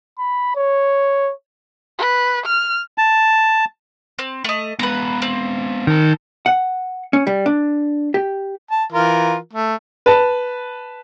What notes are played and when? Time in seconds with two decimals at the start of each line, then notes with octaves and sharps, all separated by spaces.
0.19 B5
0.56 C#5
1.99 B4
2.46 F6
2.98 A5
4.19 C4
4.44 A3 D#5
4.79 G#3 B3 B4 A#5
5.22 C4
5.87 D#3 A#4 A5
6.46 F#5
7.13 C#4
7.27 G3
7.46 D4
8.14 G4
8.71 A5
8.92 E3 F4 A#4
9.53 A3
10.06 B4 A5